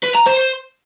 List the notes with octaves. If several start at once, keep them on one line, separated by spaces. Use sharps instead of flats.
B4
A#5
C5